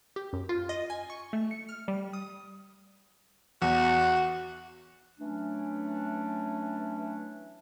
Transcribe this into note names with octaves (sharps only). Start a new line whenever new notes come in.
G4
F#2
F4
D#5
G#5
C#6
A3
C#7
F6
G3
D#6
E2 F#4
E3 F#3 A3 C#4 D4